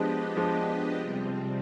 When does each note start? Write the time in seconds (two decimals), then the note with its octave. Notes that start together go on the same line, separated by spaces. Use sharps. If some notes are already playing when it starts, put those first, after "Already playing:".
Already playing: F3 G#3 B3 D4 G4 B4 D#5
0.37 F3 G#3
0.97 C3 G3 C4